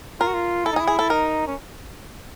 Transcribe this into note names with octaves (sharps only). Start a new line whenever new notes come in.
F4 A#4
F#4
F4
E4 A4
D#4
G#4
E4
G#4
A4
D#4 A#4
C#4